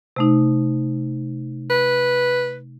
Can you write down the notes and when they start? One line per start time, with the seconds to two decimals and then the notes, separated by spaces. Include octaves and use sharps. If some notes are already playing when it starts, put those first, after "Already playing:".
0.16 C3 A3 D#4
1.70 B4